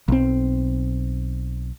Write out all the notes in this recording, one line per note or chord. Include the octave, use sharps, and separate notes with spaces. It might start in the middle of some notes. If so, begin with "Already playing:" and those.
B1 C4